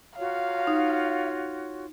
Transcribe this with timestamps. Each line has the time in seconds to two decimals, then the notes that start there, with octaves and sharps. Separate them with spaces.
0.18 F4 F#4 C#5 F5
0.67 D#4